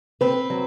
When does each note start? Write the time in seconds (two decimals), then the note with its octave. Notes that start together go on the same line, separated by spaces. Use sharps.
0.21 C4 B4
0.50 F#3